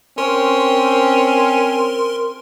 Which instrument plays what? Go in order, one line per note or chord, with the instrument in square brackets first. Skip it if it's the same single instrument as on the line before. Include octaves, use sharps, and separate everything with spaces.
[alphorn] C4 [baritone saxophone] C#4 [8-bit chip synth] A#4 C6